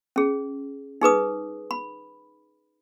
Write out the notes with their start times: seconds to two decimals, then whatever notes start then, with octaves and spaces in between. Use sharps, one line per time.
0.16 C#4 G#4
1.01 D#4 G#4 B4 D#6
1.71 B5